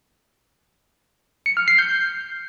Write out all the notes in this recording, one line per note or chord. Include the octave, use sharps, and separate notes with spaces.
C#7
F6
C7
G6